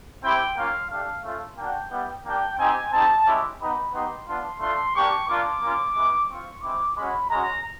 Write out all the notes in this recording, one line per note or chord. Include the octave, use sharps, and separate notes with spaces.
C4 E4 G4 G5
A#3 C#4 F4 F5
A3 D4 G4 F5
A3 C#4 F4
A#3 D4 F#4 G5
G3 B3 E4
A#3 D4 G4 G5
C4 D#4 G4 G#5
C4 D#4 G4 A5
G#3 C#4 E4 G4
B3 D#4 G4 B5
B3 D#4 G4 C6
B3 D4 F4 C6
A3 D4 F4 C6
A#3 D4 G4 C#6
A#3 D4 F4 D6
A#3 C#4 F4
G#3 B3 E4
C4 F4 C#6
G#3 C4 E4 D6
G#3 C#4 F#4 B5
G#3 C#4 F#4 A#5